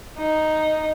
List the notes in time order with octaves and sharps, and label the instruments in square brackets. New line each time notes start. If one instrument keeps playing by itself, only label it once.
[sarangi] D#4